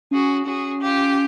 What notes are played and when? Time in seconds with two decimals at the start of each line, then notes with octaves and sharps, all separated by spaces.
0.11 C#4 F#4 G#4
0.46 C#4 F#4 G#4
0.81 F4 G4